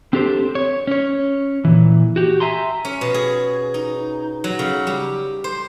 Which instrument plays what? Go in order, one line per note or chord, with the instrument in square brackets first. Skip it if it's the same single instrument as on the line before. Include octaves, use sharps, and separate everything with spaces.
[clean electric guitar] C4 D4 G4 A4 C5
C#5
C#4 C#5
A#2 E3
F#4 G4
E5 G#5 A#5 C6
[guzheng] C#4
B2
G#4
D#4
F#3
C#3
G3
C5